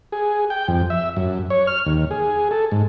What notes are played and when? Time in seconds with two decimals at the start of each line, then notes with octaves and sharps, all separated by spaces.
0.12 G#4
0.50 G5
0.68 F2
0.90 E5
1.16 F#2
1.50 C#5
1.67 F6
1.86 D#2
2.11 G#4
2.51 A4
2.72 G#2